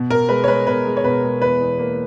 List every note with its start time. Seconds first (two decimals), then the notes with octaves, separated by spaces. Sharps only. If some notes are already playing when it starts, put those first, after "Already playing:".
Already playing: B2
0.10 B2 A#4
0.29 G#3 B4
0.44 C#5
0.47 G#3 B4
0.67 B2 B4
0.86 G#3
0.97 C#5
1.04 B2 B4
1.23 G#3
1.42 E2 B4
1.60 E2
1.79 A#3